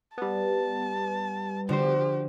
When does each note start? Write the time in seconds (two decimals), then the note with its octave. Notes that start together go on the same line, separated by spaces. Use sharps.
0.18 G3 B3 A5
1.69 D3 F3 F#4 G4 C5